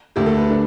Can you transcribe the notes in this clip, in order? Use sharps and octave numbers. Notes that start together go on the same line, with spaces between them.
D2 D3 A3 G4
A4
B4
D3 A3 D4